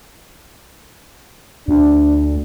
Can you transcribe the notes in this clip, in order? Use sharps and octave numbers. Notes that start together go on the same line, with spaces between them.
D2 D4